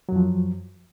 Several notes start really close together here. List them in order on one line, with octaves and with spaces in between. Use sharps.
F#3 F#2 F3